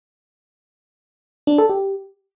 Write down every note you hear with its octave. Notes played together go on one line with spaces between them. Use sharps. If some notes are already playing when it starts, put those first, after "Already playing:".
D4
A4
G4